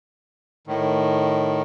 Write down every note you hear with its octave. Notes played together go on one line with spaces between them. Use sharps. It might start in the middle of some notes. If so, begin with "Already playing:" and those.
A2 D#3